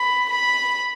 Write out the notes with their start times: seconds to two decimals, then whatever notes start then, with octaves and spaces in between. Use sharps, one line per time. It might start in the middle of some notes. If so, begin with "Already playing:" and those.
Already playing: B5
0.30 B5